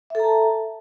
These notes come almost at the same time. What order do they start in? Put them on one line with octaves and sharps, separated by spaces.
E5 A4 A#5 A5